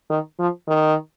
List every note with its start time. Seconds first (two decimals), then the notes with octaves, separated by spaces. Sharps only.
0.10 D#3
0.39 F3
0.68 D#3